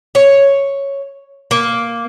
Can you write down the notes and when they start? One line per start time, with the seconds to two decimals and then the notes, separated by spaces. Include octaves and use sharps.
0.15 C#5
1.51 A#3